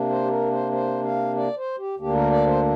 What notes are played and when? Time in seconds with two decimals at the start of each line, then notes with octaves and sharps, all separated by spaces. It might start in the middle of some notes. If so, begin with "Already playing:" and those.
Already playing: C3 A#3 D4
0.09 C5
0.25 G4
0.30 A#4
0.51 C5
0.72 C5
1.04 F5
1.36 D5
1.57 C5
1.78 G4
1.99 D2 D3 A#3 D4 G4
2.15 A#4
2.31 D5
2.46 C5